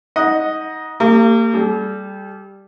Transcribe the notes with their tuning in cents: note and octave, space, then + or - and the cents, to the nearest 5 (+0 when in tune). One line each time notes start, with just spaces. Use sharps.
D#4 +30 D#5 +0 F#5 -5
A#3 -35 G4 +15
G3 +0 A4 -40